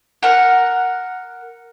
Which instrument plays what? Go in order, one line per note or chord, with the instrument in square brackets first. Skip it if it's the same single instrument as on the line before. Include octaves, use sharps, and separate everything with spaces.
[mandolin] A#4 F#5